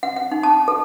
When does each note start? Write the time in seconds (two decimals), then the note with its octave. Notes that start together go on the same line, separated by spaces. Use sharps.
0.03 F#5
0.16 F#5
0.32 D#4
0.43 A5
0.68 A4